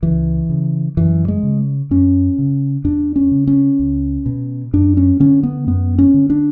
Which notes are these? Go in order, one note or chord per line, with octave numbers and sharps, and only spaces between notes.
C#2 E3
C#3
F#2 E3
G#3
C#3
F#2 C#4
C#3
E2 D4
C#4
C#3
C#4
C#2
B2
F#2 D4
C#4
D3 C#4
B3
F#2 B3
C#4
D3
D4